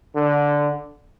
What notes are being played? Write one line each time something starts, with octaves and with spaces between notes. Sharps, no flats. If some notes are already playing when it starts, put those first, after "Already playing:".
D3